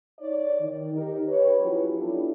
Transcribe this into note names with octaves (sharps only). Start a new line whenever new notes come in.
D#4 C#5 D5
D#3
D#4 G4 A#4
G4 B4 C#5
F3 F#3 C#4 E4 F4 G4
B3 D4 E4 F4 G4 A4